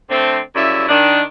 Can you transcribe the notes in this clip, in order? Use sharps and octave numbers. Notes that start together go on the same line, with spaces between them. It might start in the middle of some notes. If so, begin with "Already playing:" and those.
D3 A3 C4
F#2 C#3 G3 E4 E5
D#3 D4